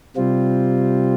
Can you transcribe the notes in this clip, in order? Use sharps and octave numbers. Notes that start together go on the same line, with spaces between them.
C3 G3 C4 F4